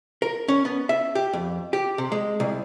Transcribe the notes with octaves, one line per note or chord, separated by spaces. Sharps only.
A#4
C#4
B3
E5
G4
F2
G4
C3
G#3
C2